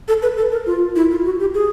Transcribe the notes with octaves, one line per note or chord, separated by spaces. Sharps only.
A4
B4
A4
A#4
F4
E4
F4
F#4
G4
G#4